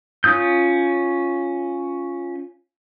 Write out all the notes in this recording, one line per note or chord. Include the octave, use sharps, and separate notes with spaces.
C#4 F4 D#6 G6